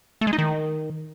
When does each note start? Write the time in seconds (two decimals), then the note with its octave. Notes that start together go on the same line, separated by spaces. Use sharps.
0.21 A3
0.27 G#3
0.33 D#4
0.38 D#3